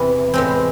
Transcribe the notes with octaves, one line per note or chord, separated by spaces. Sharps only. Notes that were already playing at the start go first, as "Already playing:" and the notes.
Already playing: E2 C3 E3
A2 G#3 C4